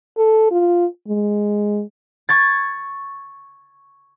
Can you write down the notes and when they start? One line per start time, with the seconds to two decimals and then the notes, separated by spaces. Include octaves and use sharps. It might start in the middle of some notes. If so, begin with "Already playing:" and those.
0.17 A4
0.51 F4
1.08 G#3
2.29 C#6 G#6 A6